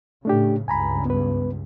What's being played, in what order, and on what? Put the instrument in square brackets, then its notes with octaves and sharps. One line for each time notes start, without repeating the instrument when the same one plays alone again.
[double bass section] A2 C#3 [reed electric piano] A3 D4 G4
[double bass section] C#2 G2 [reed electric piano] G#5 A#5 B5
[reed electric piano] B3 B4